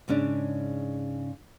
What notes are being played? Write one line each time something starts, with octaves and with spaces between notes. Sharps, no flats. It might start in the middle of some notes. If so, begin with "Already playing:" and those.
G#2 C#3 C#4 D4